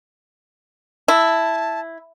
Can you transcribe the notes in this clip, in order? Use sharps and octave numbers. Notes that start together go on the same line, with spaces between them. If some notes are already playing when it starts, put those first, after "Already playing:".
E4 A5